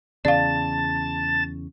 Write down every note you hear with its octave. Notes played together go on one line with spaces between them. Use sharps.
E2 C#3 D5 F5 A5 A6